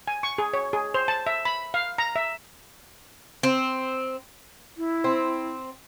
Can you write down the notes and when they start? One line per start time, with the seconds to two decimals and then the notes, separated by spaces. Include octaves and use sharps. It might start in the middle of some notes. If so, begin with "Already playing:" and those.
0.07 G#5
0.23 C#6
0.38 G#4
0.53 C#5
0.73 G#4
0.94 C5
1.08 A5
1.27 E5
1.45 B5
1.74 F5
1.98 A#5
2.16 E5
3.43 C4
4.77 E4
5.04 C4